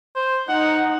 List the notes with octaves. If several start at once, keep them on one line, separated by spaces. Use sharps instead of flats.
C5
D#4 F#5